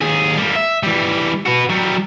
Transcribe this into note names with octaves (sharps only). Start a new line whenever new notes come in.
D#2 G#4
G3 A#3
E5
E3 G3
F#4 B4
F#3 G3